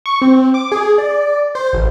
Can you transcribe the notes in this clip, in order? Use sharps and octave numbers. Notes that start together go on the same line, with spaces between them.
C#6
C4
D6
G#4
D5
C5
A1